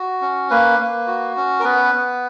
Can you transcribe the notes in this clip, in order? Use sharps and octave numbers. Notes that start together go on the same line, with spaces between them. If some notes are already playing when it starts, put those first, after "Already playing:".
Already playing: F#4
C#4
A#3 B4
A#3
F#4
C#4
A#4
B3 B4
B3